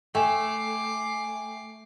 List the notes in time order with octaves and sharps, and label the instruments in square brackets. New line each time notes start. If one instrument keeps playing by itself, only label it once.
[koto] A3 [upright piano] G5 G#5 E7 [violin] D6 C7